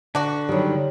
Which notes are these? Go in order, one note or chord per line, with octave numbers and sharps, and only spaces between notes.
D3 D4 F#4
D#3 F#3 G3